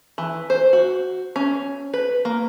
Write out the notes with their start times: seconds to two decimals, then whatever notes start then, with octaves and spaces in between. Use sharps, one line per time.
0.18 E3
0.50 C5
0.73 F#4
1.36 C#4
1.94 B4
2.25 A#3